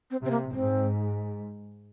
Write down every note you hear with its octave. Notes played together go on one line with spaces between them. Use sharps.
C4
C3 C4
A#3
G#2 C4